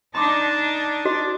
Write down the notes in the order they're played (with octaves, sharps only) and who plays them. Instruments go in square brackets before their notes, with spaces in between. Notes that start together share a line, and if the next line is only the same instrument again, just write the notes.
[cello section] D4 D#4 [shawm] A5 [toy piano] B5 C6 D6
[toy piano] F#4 D#5 [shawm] D5